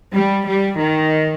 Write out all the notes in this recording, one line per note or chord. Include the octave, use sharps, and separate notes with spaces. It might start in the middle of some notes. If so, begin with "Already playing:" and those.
G3
G3
D#3